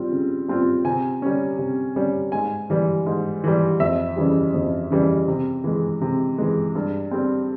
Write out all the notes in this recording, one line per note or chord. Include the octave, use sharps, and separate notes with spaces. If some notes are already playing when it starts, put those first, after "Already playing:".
Already playing: G3 C4 F4
C#3
G3 C4 F4
C3 G#5
G3 C#4
C3
G3 C#4
G#2 G#5
E3 G3
G#2
E3 G3
F2 E5
C#3 E3 G3
F2
C#3 E3 G3
C3
E3 G#3
C3
E3 G#3
G2
G3 C4